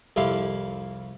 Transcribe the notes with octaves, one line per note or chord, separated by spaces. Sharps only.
C2 F2 F3 E4 G4 F5